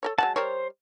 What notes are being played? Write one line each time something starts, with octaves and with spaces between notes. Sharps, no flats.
A4 A#4 C#5
F#3 G#3 F#5 A5
G3 A#4 C5 C#5